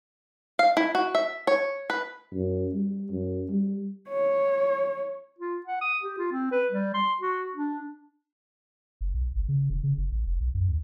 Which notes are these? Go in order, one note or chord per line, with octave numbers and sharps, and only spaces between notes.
F5
E4
F#4
E5
C#5
B4
F#2
G3
F#2
G3
C#5
F4
F#5
D#6
G4
F4
C4
B4
G3
C6
F#4
D4
F#1
B1
G1
C#3
E1
C#3
F#1
A1
F1
B1
F#2
D2